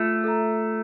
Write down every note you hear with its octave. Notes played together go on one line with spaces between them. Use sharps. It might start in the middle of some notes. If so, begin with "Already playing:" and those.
Already playing: A3 F4
A4 E5 A#5